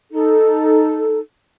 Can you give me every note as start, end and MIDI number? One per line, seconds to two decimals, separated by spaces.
0.11 1.19 63
0.11 1.19 69